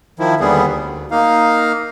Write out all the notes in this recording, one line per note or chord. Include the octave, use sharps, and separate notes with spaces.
D#3 F3 E4
D#2 D3 G3 B3 G#4
D2
A#3 D#4 F5